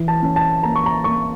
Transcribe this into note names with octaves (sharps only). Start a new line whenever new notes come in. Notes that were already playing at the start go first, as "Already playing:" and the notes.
Already playing: E3
A5
C#4
A5
A#3 A#5
C#6
A#5
A#3 C#6